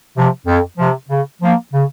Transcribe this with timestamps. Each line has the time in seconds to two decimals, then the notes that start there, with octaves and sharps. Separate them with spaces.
0.16 C3 F3
0.47 F2
0.78 C3 F3
1.09 C#3
1.41 F3 A#3
1.72 C#3